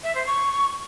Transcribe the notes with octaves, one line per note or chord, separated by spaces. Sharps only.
E5
C5
C#6